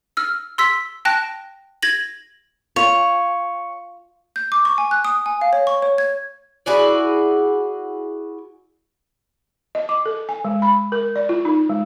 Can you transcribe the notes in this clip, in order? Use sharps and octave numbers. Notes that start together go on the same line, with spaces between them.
E6 F6
C6 E6 B6
G5 A5 F#6 A#6
G#6 A#6 F#7
F4 C#5
G6
D6
C#6
G#5
F#6
D#6
G#5
F5
C#5
C#6
C#5
G#6
E4 F#4 G#4 D5
D#5
D6
A4
G#5
G#3
B5
A#4
D5
F4
D#4
G#3